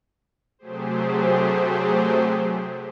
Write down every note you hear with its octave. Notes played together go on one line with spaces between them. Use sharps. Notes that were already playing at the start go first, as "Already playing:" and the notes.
C3 F#3 A3 G4 G#4 C5